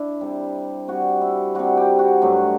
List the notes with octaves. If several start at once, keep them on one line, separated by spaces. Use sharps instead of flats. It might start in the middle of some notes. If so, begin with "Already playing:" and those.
Already playing: D4 E4
C3 G3
C3 G3 F#4
E4
C3 G3 F#4
G4
F#4
G2 F#3 A3